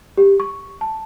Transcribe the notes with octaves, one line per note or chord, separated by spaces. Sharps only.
G4
C#6
A5